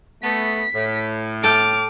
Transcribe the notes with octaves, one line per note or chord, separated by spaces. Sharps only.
A3 B3 B6
A2
A4 G5 D6 F6